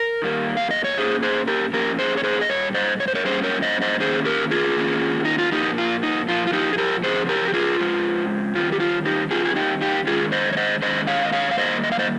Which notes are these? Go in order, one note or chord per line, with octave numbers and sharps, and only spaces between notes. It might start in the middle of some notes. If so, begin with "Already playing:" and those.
Already playing: A#4
D#3 G3 A#3
F5
D#5
C#5
A#2 F3 A#3 C#4 G#4 C5
G#4 C5
G4 A#4
A#2 F3 A#3 C#4 G4 A#4
G#4 C5
C#5
G#4 C5
D#5
A#2 G3 C#5
C5 D#5
C#5
C5
A#4 C#5
A#2 G3 A#3 C#4 G#4 C5
A#4 C#5
C5 D#5
C5 D#5
D#3 A#3 C#4 G#4 C5
G4 A#4
F4 G#4
D#3 A#3 C#4
D#4
F4
A#2 F3 A#3 D#4 G4
F4
D#4
A#2 F3 A#3 F4
F4
D#4 G4
G#4
G4 A#4
C#3 F3 C4 G#4 C5
G4 A#4
G4
F4 G#4
C#3 F3 G#3 C4
D#3 G3 C4 F4
G4
F4
D#4 G4
D#3 G3 C4 F4 G#4
G#4
D#4 G4
D#4 G4
D#3 G#3 C#4 F4 G#4
C5 D#5
C#5
C5 D#5
D#3 G#3 C#4 C5 D#5
C#5 F5
D#5
C#5 F5
F5
D#3 G3 A#3 C5 D#5
D#5
F5
C5 D#5